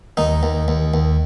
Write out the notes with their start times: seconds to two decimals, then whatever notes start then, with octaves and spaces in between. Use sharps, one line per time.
0.17 D#2 D#4
0.43 D#2
0.68 D#2
0.94 D#2